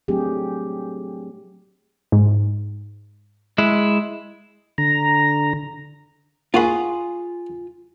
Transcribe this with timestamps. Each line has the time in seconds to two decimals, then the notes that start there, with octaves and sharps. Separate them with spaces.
0.08 F#3 A3 C4 D4 G4 G#4
2.12 G#2
3.58 G#3 E4
4.78 D3 A#5
6.54 A#3 F4 F#4 G#4 B5